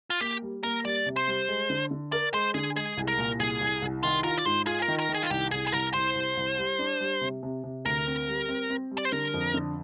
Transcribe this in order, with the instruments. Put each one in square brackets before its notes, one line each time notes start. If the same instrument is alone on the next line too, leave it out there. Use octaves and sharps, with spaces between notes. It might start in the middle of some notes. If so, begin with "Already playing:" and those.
[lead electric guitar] F4
[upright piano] A#3 [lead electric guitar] G4
[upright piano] G3
[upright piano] A#3 [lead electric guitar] A#4
[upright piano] G3 [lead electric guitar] D5
[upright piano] C3
[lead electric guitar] C5
[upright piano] G3
G#3
D3
D3
[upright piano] A#4 [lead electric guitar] D5
[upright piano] G#3 [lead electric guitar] C5
[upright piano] D3 [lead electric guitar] G#4
[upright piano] G#3 [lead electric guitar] G#4
[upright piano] C2
[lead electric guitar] A#4
[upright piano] A#2
[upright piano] C2 [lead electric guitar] G#4
[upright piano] C2
C2
[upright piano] D#3 [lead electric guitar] F4
[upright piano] F4 [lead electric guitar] A#4
[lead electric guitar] D5
[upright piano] G#2 [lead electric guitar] C5
[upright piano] F4 [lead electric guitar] G#4
[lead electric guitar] A#4
[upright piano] D#3
[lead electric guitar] A#4
[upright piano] D#3
[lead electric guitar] G#4
F4
[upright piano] C2 [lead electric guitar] G4
[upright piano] C2 [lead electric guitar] G#4
[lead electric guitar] G#4
[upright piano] C2 [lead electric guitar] A#4
[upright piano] C2 [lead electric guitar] C5
[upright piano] C2
C2
G3
D4
G3
C3
C3
C3
[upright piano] D2 [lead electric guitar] A#4
[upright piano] C4
G3
C4
C4
G3
[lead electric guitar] D5
C5
[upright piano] D3 [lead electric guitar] A#4
[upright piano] F2
D3